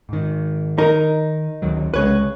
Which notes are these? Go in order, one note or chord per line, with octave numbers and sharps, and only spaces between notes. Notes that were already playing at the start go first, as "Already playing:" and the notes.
G#2 D#3
D#3 D#4 A#4
D2 D#3 F#3
C2 C#3 G#3 B4 C#5